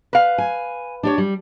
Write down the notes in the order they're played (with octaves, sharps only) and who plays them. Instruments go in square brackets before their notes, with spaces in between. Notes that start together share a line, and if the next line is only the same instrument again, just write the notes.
[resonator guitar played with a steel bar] B4 F5
[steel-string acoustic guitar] G#5
D4 G4 C#5
G3